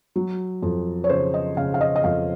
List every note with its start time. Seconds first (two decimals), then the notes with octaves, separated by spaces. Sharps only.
0.16 F#3
0.63 F2
1.04 C#5
1.09 C#3 C5
1.34 D#5
1.57 C#3 F5
1.74 F5
1.81 D#5
1.96 D#5
2.04 F2 F5